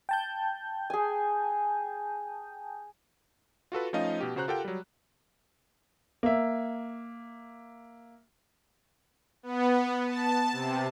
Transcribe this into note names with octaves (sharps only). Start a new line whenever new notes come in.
G5 A5 G6
G#4 G#5
F4 F#4 A4 B4
F3 A3 C#4 D#4 D#5 F5
B2 G4
C#3 F#4 C5 A#5 F#6
F4 G4 A4 A#4 F#5 G5
F#3 G3
A#3 E5
B3
A5
C3